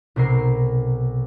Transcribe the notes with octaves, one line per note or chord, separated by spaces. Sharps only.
B1 C3 A#4 C7